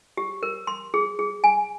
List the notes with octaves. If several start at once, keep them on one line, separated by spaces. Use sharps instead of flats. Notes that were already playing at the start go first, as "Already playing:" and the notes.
G4
A#4
C6
G#4
G#4
G#5